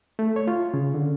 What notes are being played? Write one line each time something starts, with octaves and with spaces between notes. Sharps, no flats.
A3
C#5
F4
C#3
D3